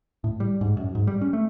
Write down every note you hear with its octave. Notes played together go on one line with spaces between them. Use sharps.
A2
G3
G#2
F#2
G#2
G3
C#4
A3